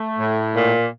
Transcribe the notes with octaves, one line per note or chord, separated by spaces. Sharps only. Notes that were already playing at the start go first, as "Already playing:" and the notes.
Already playing: A3
A2
A#2